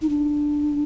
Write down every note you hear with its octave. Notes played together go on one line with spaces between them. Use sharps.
D#4
D4